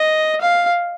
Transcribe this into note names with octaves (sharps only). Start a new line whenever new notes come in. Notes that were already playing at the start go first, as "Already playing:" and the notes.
Already playing: D#5
F5